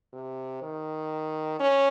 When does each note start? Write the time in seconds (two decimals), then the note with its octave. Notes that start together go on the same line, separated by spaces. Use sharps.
0.13 C3
0.63 D#3
1.60 C#4